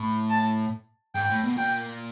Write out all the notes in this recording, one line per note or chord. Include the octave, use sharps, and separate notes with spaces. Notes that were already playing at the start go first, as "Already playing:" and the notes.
Already playing: A2
A5
G#2 G5
A2
B2
A#2 G5